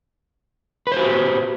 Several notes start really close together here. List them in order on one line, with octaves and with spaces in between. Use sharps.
B4 C5 F#4 G4